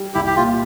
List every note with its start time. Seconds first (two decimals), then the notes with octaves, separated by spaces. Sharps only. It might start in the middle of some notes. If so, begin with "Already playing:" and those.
Already playing: G3
0.14 C2 E4 G4
0.26 G4
0.36 A#2 F4